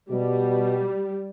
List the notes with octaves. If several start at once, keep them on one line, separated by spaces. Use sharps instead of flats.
B2 G3